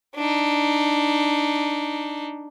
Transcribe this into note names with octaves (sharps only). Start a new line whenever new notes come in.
D4 D#4